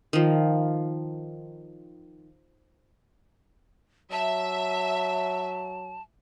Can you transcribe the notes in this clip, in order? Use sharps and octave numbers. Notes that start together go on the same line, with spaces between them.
D#3 F3
F#3 E5 A5